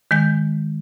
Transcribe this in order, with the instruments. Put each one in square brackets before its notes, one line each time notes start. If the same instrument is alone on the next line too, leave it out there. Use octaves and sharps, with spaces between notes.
[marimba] D#3 G#3 G6